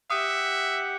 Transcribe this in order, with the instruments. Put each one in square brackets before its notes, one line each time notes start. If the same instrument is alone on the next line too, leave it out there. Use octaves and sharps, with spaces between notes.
[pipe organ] G4 F#5 [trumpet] E5 [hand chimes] D#6